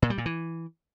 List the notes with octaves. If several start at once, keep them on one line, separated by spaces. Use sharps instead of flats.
A#2
G3
A#2
E3